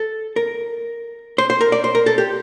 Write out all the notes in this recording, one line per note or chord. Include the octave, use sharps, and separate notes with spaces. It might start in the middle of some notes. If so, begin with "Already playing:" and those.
Already playing: A4
A#4
C5
C5
A#4
D5
C5
A#4
A4
G4